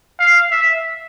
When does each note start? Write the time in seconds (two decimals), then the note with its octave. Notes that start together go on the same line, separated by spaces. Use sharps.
0.19 F5
0.51 E5